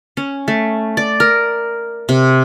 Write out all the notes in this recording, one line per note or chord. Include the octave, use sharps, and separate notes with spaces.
C#4
A3
D5
A#4
C3